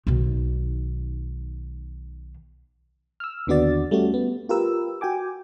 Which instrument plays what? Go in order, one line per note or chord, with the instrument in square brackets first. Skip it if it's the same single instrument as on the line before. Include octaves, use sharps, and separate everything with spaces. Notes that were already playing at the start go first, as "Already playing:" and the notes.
[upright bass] B1 D#3
[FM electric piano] E6 F6
D#2 D3 B3 F#4 D5 A6
G3 A3 C#4 F#4
B3
F4 G4 A#4 B4 E6
F#4 G5 G#5 D6